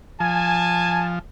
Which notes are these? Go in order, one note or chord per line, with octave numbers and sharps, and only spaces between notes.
F3 G#5 A5